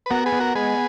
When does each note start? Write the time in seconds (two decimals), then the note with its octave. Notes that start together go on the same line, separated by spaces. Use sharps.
0.06 B4
0.10 B3 F#4 A#4
0.26 G#4 B4
0.32 B3
0.40 F#4 A#4
0.55 G#3 G#4 B4